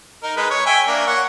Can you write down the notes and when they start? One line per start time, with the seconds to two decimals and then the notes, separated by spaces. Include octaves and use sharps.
0.23 D#4 A#4
0.37 G#3 D#4 B4
0.51 C#5
0.66 E5 G5 G#5
0.87 A#3 D4
1.07 C#5 F#5